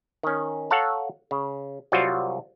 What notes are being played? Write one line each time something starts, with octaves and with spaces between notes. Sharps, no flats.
D#3 C#4
A4 C#5 F5 F#5 A5 A#5
C#3
C2 F#3 G3 F4 F#4 C5